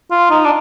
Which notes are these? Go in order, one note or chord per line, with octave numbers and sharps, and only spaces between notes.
F4
D#4
D4